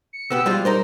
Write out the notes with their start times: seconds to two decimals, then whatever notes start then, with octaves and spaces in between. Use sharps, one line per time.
0.13 C#7
0.30 B2 B3 G4 E6
0.46 F3 G3 G#3 F4
0.65 D#4 A#4 C5